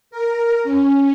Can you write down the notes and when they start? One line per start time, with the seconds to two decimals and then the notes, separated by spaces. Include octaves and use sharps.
0.11 A#4
0.64 C#4